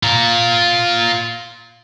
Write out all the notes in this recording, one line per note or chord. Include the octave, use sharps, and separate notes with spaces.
F4 A#5